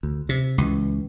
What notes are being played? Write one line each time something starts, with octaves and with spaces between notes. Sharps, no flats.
D2
C3
C#2 E3